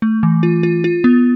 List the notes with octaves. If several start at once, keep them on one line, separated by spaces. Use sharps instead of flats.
A3
E3
F4
F4
F4
B3